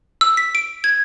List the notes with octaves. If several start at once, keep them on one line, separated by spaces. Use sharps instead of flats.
E6
B6
D7
G#6